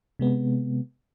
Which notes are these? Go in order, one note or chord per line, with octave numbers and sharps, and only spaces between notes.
C3 G#3 B3